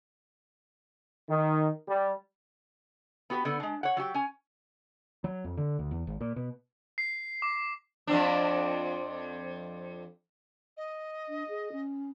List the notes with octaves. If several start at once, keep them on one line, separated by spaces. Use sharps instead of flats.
D#3
G3
B3 F#4 G4 A#4 B4
D3 B3
G#3 D4
C#5 F#5
F#3 F#4 G4
C#4 G#5
F#3
F2
D3
D2
E2
G#1
A#2
B2
C7
D6
F2 C4 D4
D#5
D4
G#4
C#4